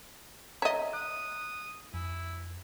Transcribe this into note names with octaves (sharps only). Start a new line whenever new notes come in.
C#5 D#5 E5 A#5 B6
D#6 F#6
F2 E4